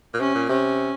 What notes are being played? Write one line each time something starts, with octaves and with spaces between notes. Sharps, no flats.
A#2
C3 C#4
A#2
C3 C#4